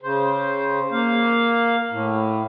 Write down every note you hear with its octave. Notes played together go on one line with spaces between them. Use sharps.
C#3 C5
A#3 F5
A2